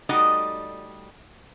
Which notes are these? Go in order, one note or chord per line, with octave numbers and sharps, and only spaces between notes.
G3 A3 D#4 F#4 D5 D#5